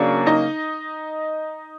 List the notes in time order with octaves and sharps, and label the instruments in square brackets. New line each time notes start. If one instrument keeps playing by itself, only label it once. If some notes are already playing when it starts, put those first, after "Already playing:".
Already playing: [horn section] C#3 F#3 A#3 [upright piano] D4 D5
[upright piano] D#4 D#5